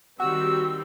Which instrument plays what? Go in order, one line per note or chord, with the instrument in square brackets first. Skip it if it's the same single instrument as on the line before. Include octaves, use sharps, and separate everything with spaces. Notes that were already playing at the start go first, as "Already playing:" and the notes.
[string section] D#3 G3 C4 [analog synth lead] F#4 [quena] E6